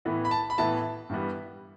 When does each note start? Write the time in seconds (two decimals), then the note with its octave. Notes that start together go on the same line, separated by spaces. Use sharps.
0.05 A2 E3 B3 E4
0.25 B5
0.31 A5
0.50 B5
0.58 A2 E3 B3 E4 A5
1.10 G2 E3 G3 B3